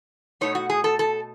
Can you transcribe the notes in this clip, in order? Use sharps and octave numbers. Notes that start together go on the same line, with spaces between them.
B2 A3 D#4 C#5
F#4
G#4
A4
A4